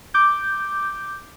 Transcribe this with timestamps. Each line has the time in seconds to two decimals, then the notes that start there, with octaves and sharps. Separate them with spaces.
0.14 D6 G6